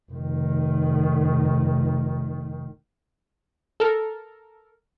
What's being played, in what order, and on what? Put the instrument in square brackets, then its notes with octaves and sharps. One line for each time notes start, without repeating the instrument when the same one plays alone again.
[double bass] F1 D#3
[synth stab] A4 A#4